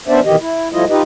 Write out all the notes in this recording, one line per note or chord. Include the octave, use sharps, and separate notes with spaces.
B3 C#4 D4 C5 D5 E5
B2 D#3 E3 G4 D#5
E4
F3 G3 A3 E4 F4 D#5
D#4 F4 G4 B4 D#5